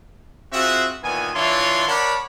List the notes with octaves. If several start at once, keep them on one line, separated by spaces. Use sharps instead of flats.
C4 F4 F#4 G#4 E5 F#5
A#2 D#3 E3 B3 G#5
E3 D4 E4 F4 C#5 C6
A#4 C#5 D5 F#5 A5 B5